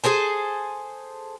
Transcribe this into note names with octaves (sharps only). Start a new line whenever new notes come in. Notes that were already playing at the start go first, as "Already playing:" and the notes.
G#4 A4 C5 G#5